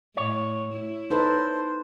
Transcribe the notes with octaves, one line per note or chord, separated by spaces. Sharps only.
A2 C#5
E4
D#4 A4 B4 C5